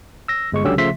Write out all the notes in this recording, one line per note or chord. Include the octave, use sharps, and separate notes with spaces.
E6 A#6
G1 G#3 C#6
C#2 D3 F#3 C#4 G4 E6
C#3 F3 A3 E5 C6 B6